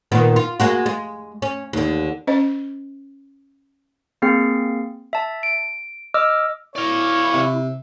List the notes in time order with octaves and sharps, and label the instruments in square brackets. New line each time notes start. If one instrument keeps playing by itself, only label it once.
[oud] A#2 D#3 B3
F4
G#3 A#3 F#4
G#3
C#4
D#2 D3
[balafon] C#4 C5 D#5
[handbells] A#3 C4 G#4 C7
E5 A5
D7
D#5 D6 E6 F6
[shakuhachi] E4 [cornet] C#5 [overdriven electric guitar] D5 F5
[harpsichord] C3